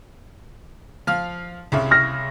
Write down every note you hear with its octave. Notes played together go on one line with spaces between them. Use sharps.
F3 F5 F6
C2 C#3 E4
F6 A#6